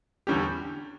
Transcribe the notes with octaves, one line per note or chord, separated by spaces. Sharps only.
E2 D3 G3 C#4 G4